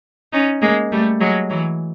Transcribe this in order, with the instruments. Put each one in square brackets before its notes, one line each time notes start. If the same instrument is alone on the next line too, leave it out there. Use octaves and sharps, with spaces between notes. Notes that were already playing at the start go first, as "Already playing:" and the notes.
[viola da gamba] C#4 D#4
G#3 A#3
G3 A3
F#3 G#3
E3 F#3